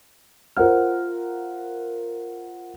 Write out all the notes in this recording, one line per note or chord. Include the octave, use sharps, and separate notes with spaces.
F4 A#4 C5 F#5 F6